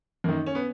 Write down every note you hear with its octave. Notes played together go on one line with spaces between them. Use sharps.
F#2 D#3 A#3
C#4
B3